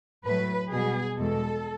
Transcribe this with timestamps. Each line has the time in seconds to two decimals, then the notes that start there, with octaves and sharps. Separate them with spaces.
0.25 A2 F#3 A3 B4
0.71 B2 G3 B3 G#4
1.18 E2 B2 G#3 A4